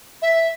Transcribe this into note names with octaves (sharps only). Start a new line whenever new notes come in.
E5